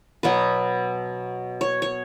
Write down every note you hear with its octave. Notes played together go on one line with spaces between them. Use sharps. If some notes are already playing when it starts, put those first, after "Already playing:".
B2 F#3 B3 B4
C#5
C#5